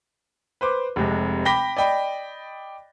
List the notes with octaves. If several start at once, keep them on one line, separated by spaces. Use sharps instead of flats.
B4 C5 D6
F1 C3 G#3
G5 B5 D6 A#6 B6 G7
D5 D#5 G5 B5